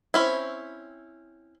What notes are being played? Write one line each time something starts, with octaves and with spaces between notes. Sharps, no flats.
C4 C#4 E4